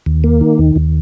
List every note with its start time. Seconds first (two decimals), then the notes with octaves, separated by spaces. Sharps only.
0.06 D#2
0.24 A#3
0.41 D#3
0.59 D#2
0.76 D#2